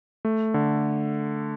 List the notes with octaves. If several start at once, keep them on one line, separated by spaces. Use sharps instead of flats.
A3
D3